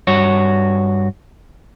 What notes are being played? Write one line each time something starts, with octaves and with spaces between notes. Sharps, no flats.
G2 F#4 C#5